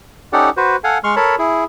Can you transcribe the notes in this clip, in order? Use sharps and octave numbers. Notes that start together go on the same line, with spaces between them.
C#4 D#4 G4 A4 D5 F#5
F#4 B4 C5
A4 F5 F#5 G#5
G#3 C6 C#6 F6
A4 A#4 C#5 A5 B5
E4 G#4